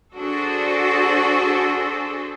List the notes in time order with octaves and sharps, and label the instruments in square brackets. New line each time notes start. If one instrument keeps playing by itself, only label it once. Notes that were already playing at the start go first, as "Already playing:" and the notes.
[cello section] D4 F#4 G#4 A4 C5